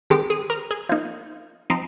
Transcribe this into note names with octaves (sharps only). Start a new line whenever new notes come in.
D#3 G#3 C4 G4
G#4
A#4
G#4
F3 A#3 D#4
F3 C4 D#4